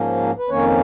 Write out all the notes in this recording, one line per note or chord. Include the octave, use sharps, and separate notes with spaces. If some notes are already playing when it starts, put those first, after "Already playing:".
Already playing: G#2 F3 A#3 C#4
B4
F2 D#3 A#3 C#4 C#5